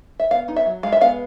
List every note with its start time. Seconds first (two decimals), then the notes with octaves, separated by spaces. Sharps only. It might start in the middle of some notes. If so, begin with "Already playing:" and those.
0.20 E5
0.31 B3 F5
0.48 D#4
0.56 E5
0.66 F#3
0.83 G#3 F5
0.92 E5
1.01 B3 F5